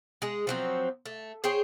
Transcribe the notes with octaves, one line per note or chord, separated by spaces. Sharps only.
G#3 G#4
F3 F#3 C4
A3
G#4 C5 C#5 G5